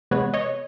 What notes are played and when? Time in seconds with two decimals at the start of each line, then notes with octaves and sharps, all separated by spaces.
0.11 C3 E3 G#3 B3 B4 C#5
0.34 C#5 D#5